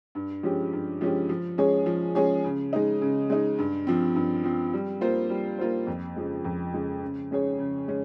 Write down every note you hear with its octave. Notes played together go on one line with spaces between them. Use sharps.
G2
F3 G#3 C#4 G4
G2
F3 G#3 C#4 G4
F3
G#3 C#4 G#4 C#5
F3
G#3 C#4 G#4 C#5
C#3
G#3 D#4
C#3
G#3 D#4
G2
F3 C4
G2
F3 C4
G3
A#3 F4 C5
G3
A#3 F4 C5
F2
C#3 F3 G#3
F2
C#3 F3 G#3
C#3
G#3 C#4 G#4 C#5
C#3
G#3 C#4